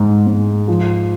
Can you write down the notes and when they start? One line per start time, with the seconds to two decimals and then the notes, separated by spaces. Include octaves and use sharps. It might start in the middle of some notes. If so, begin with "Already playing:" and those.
Already playing: G#2 G#3
0.27 G#2
0.68 F3